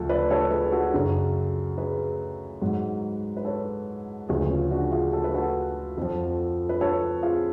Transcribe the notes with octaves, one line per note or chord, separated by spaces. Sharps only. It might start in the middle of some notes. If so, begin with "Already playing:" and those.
Already playing: D2 C#3 F3 A4
B4 D5
A4 C#5
G#4 B4
F#4 A4
F#2 C#3 F#3
G#4 B4
G#2 F#3
B4
A4 C#5
D2 C#3 F3 G#4 B4
C#4 F4
D4 F#4
F4 G#4
A4
B4
F#4 A4
F2 F3
B4
A4 C#5
F4 G#4